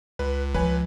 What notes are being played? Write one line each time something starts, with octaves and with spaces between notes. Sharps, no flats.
C#2 B4
F3 B4 C#5 G#5